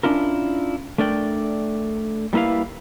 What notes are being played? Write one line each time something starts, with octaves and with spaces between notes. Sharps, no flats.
C#4 D4 E4 F4 A#4
A3 D4 A#4 D5 G5
G3 A#3 E4 B4 F5